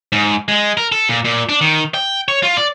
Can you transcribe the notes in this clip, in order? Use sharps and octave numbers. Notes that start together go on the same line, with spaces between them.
G#2
G#3
A#4
A4
A#2
A#2
D4
D#3
G5
C#5
F4
D5